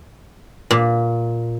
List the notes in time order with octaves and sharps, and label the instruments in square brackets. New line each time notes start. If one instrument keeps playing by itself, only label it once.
[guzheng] A#2